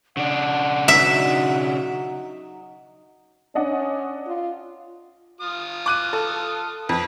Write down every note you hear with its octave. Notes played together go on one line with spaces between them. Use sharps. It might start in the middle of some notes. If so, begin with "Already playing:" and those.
C#3 D4 F#5
F#3 D#4 E5
C#4 D4 D#5 F#5
F4
F4 D#6
D6 F#6 D#7
A4
F2 B4